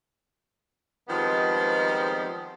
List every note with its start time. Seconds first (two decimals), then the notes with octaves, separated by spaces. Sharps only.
1.08 D#3 F3 G3 G#3 B3 C4